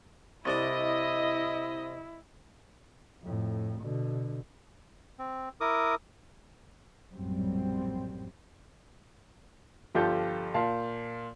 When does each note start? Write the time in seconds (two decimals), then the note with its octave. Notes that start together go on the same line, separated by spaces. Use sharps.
0.45 C2 D4 E4 D#5 D6
3.23 F2 A2
3.81 B2 D3
5.19 C4
5.61 E4 A#4 D6 D#6
7.14 A#1 F#2 A2 F#3 G3 C4
9.95 G1 F3 F4 G4 A4 G6
10.54 A#2 F5 A5